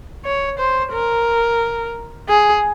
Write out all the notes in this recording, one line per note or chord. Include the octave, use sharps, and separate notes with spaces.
C#5
C5
A#4
G#4